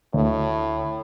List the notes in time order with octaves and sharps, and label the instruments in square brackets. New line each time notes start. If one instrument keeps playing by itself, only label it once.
[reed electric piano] D2 [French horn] A2